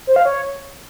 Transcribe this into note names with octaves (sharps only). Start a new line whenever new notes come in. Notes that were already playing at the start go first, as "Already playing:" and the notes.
C5
F5
C#5